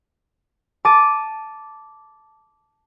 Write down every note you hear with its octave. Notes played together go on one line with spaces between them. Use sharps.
A5 D6 A6 D#7